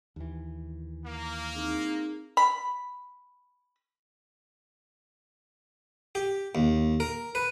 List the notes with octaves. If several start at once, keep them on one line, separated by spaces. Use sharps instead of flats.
D#2 E3
A#3
C4 D#4 G#4
B5
G4
D#2
A#4
B4